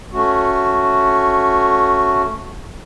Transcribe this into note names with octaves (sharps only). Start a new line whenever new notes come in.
A3 C#4 F#4